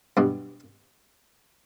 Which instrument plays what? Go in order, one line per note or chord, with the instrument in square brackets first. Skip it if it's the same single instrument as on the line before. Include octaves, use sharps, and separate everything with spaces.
[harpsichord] G2 B2